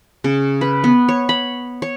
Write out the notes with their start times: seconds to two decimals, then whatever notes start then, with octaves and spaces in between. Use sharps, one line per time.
0.24 C#3
0.61 B4
0.84 B3
1.09 C#5
1.29 B5
1.82 C#5